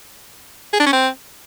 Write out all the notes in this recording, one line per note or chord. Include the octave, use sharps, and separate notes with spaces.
G#4
D4
C#4
C4